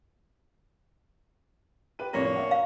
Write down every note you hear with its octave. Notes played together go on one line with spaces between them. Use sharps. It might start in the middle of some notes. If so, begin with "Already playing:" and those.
G4 B4 D#7
F2 A2 C3 A#3 D4 C#5
D5 E5 F#5
F5